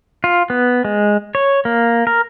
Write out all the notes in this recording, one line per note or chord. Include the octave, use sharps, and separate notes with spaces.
F4
B3
G#3
C#5
A#3
A#4